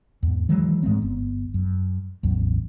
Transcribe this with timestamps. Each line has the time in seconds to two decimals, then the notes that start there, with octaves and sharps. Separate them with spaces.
0.23 E2 G#2
0.49 D#3 E3 F#3 G#3
0.83 G#2 G#3 A3 C4
1.02 G1 B3
1.54 F#2
2.23 A1 E2 F#3